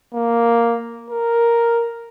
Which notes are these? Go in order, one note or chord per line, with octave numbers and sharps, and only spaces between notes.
A#3
A#4